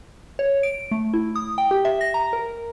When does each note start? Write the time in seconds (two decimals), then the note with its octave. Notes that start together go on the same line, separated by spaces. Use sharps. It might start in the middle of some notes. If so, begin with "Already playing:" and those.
0.39 C#5
0.63 D7
0.91 A3
1.14 E4
1.36 D#6
1.58 G5
1.71 G4
1.85 E5
2.01 A#6
2.14 A#5
2.33 A#4